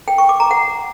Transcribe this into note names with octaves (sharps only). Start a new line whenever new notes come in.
G5
C#6
D6
A#5
F#5